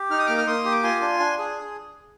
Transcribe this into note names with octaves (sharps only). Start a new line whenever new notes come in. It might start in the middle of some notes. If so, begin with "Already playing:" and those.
Already playing: G4
D#4 F6
D#6
A#3 D6 F6
F6
A#3 C6 D#6
G4
D6
F4 G#5 C6
D4
D4
G#4